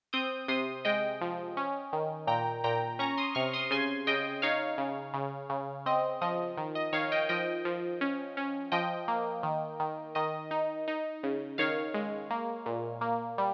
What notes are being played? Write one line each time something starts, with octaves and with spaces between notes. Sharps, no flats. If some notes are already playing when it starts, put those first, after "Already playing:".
C4 D#6 G6
C3 C6 D#6
G#3 D#5 G5
F3
C#4
D#3
A#2 G5 A#5
A#2 G5 A#5
C#4 A#5 C#6
C6 D#6
C3 C#6 F6
C6 D#6
C#3 G#5 C6
C#3 D#5 G5
D#4 C#5 F5
C#3
C#3
C#3
C4 D#5
F3 D#5
D#3
D#5
D#3 C#5 F5
D#5 G5
F3 D#5 G5
F3
C#4
C#4
F3 D#5 G5
A#3
D#3
D#3
D#3 D#5
D#4
D#4
C#3
D#3 C#5 F5
G#3
A#3
A#2
A#3
G3